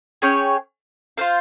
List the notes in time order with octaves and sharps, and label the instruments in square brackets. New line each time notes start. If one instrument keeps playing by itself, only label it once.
[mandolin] C#4 G#4 C#5 G5
F4 C5 F5